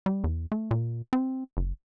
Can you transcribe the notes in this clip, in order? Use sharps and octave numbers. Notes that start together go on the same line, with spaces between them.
G3
E2
A3
A#2
C4
F#1